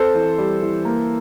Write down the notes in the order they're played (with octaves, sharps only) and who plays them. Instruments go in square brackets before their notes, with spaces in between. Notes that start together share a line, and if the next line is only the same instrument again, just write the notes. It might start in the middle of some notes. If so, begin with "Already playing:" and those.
Already playing: [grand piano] C4 [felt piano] A4 C5
[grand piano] E3
G3
E3
A#3